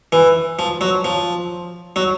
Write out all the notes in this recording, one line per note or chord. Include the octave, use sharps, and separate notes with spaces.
E3
F3
F#3
F3
F#3